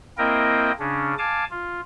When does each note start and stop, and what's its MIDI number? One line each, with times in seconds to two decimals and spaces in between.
0.18 0.72 58
0.18 0.72 60
0.18 0.72 64
0.18 0.72 70
0.18 0.72 75
0.18 0.72 79
0.79 1.14 49
0.79 1.14 61
0.79 1.14 62
1.18 1.44 77
1.18 1.44 80
1.18 1.44 81
1.18 1.44 86
1.51 1.81 65